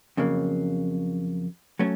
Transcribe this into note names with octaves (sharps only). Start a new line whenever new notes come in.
F2 C#3 F#3 A#3
F#3 A3 C#4